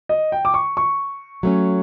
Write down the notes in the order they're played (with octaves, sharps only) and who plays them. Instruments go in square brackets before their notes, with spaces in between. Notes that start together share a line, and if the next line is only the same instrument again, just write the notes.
[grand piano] D#5
G5
D6
C#6
C#6
[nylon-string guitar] F#3 A3 C#4